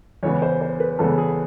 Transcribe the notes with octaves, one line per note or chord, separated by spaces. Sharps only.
E2 C#3 E3 G#3 B3 C#5
C5
C5
B4
E2 C#3 E3 G#3 B3 A4
G#4